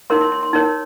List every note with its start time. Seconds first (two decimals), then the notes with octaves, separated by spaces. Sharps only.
0.10 D#4 A#4 C#5 C6
0.21 C6
0.32 C6
0.43 C6
0.53 D#4 A#4 C#5 C6